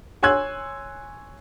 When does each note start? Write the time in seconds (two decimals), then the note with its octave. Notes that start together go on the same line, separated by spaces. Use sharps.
0.23 C#5 G#5 C6 E6 F#6 G#6